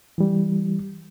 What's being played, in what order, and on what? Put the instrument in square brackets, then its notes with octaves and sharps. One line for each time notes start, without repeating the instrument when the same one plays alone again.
[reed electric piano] E3 G3